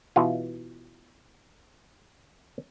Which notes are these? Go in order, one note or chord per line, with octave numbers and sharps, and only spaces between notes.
B2 E3 F4